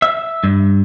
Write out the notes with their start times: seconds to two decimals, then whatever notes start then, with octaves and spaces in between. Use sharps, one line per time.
0.02 E5
0.44 G2